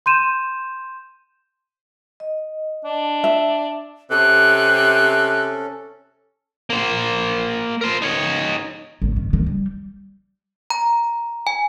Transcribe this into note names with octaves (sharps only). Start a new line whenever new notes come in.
C6 G6 D#7 E7
D#5
D4
E5
C3 C#4 A4 F#6
A#3 C5
A#4 C5
D#4 C#5
G#1
D#3
D#3
G3
A#5
G#5